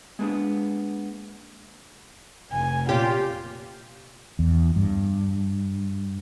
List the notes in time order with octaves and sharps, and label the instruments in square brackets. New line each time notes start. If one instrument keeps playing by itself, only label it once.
[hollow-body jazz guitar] G#3 A#3 B3 C#4 D4 G#4
[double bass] F1 [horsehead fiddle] G#5
[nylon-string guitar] A#2 C#4 [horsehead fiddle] F4 [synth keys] G4
[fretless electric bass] E2
G2